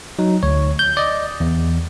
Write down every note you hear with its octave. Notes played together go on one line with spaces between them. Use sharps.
F#3 D#4
D2 C#5
G6
D5 D#5
E2